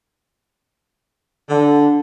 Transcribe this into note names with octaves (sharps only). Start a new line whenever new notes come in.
D3